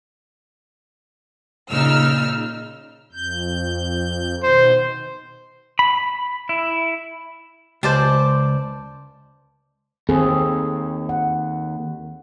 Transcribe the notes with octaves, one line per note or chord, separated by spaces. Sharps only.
A#2 C#3 D#4 E6 F6
F2 G6
B2 D#3 C5
B5
E4
C#2 C5 D5 A5
D#2 C4 G#4 A4
F#5